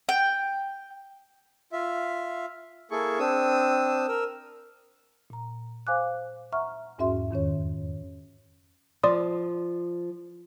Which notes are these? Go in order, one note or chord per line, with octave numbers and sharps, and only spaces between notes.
G5
F4 E5
A#3 E4 G#4 A4 C#6
C4 D4 D#6 E6
A#4 E6
A#2 A#5
C5 F5 G#5 D6 F#6
E5 F#5 A#5 C#6 F6
E2 G#2 C#4 F#4 E5 C6
F2 D#3 C#4 C#5
F3 D5 C6 D#6